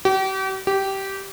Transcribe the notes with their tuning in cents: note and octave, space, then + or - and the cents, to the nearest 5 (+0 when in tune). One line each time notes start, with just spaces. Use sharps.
G4 -40
G4 -15